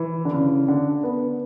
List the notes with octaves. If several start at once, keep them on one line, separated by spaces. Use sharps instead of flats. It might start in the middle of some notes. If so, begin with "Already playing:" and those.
Already playing: E3
D3
C#3
D3
B3